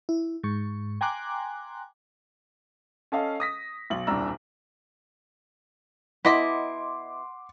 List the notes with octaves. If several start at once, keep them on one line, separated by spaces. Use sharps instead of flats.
E4
G#2 C#6
G5 G#5 A#5 C6 D6 F#6
C#4 A4 D#5 F5
D#6 A#6 B6
B1 F#7
D#1 C2 D4 A#5 E6
B2 E4 D#5 F#5 B5 C6 D6